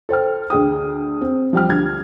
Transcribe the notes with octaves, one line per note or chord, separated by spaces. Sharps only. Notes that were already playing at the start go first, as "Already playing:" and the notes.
A4 C5 G5 F6
D2 G#4 G5 D#6
C4
F3 G3 G5 F6
D2 G4 G#6